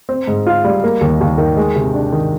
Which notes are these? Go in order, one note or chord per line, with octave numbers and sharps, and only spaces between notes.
C4
G#2
F4
G3
A#3
D#2
D#2
D#3
G#3
C3
D4
D#3